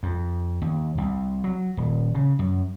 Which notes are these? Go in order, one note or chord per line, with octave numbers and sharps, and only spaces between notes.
F2
D#2
C2
F#3
D#1
C#3
F#2